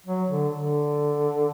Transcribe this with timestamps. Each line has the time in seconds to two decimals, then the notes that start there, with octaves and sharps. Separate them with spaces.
0.06 F#3
0.31 D3
0.56 D3